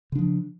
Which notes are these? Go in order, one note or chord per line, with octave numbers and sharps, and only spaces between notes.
C#3 F3 D4